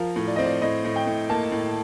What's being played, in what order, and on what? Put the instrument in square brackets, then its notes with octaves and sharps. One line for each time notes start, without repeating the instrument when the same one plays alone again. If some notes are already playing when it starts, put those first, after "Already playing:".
Already playing: [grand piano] F3 [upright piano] A#4 F5
[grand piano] A2
[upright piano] D5
[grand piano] C4 [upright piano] D#5
[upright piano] D5
[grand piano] A2 [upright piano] D#5
[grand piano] A2
[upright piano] G5
[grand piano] A2
[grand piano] A#3 [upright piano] A5
[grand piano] A2